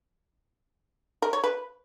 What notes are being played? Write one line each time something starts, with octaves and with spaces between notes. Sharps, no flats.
A#4
C#5
B4